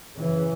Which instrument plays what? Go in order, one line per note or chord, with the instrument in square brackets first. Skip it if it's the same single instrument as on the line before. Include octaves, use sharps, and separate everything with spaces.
[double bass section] F#2 C#3 E3